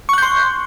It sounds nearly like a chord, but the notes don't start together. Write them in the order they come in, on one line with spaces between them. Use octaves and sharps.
C#6 F#6 G6 C6